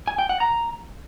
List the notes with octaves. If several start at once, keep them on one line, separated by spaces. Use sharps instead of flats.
G#5
G5
F#5
A#5